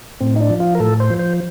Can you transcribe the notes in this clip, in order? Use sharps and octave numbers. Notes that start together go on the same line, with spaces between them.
A2 C4
D#4
D4
F3
F4
A#4
A2 A4
C5
F3
C5